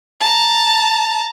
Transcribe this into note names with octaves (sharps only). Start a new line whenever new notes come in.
A5 A#5